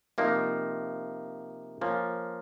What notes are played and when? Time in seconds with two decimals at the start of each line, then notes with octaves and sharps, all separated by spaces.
0.18 C3 F3 A#3 D#4
1.81 F3 A#3 C#4